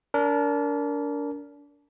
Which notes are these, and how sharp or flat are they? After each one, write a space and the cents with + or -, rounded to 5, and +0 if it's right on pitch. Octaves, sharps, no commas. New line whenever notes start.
D4 -30 A#4 -5